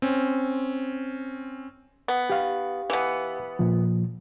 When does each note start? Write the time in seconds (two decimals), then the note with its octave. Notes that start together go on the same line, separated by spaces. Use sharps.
0.02 C4 C#4
2.08 B3
2.30 G4 F5
2.90 E3 B3
3.59 A#2 F3